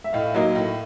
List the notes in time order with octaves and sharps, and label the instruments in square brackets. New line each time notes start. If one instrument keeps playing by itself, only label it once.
[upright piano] E5
[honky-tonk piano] A2 [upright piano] D#5 F5
[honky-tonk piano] F#3 A#3 D#4
A2